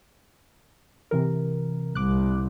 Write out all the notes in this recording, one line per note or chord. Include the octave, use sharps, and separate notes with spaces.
C3 E3 A#4
C2 D6 F#6